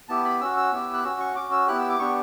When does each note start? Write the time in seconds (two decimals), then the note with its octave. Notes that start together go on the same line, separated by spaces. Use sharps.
0.09 B3 E4 G4 A5
0.25 B5
0.41 C#4 F#4 E6
0.57 E6
0.73 B3 E4 G4
0.94 F#6
1.04 C#4 F#4 E6
1.20 C#6
1.36 C#4 F#4 D6
1.51 E6
1.67 B3 E4 G4 F#6
1.79 E6
1.89 D6
1.99 B3 D4 G4 C#6